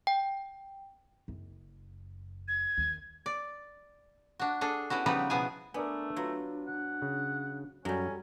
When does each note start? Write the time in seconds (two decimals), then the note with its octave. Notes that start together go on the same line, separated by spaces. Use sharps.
0.07 G5
1.28 F#1
2.48 G#6
2.78 D#2
3.26 D5
4.39 D4 F#4
4.61 D4 G#4 A4
4.90 B3 C#4 E4 F#4
5.06 C#3 F3 G3 B3 D#4 B4
5.30 B2 F3 B3 E4 G#4 G#5
5.74 A3 B3 D4 A#4 D5 G#5
6.16 F#3 F4 B4
6.67 F#5
7.02 C#3
7.85 F#2 F#3 G3 C#4 F#4 A4